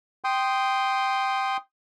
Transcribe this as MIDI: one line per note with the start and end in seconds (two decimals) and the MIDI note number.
0.24 1.57 79
0.24 1.57 84
0.24 1.57 87